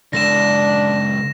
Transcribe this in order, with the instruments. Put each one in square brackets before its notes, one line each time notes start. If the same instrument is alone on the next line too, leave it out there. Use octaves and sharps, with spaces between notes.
[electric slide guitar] C#3 G#3 A4 [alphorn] D4 [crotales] A#6 E7